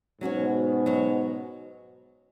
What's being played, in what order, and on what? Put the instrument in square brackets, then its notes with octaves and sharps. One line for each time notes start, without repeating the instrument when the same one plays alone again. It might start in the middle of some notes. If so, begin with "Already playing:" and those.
[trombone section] G#2 B2 [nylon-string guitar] F#3 C#4 F#4 C#5
[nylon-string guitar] F#3 C#4 F#4 C#5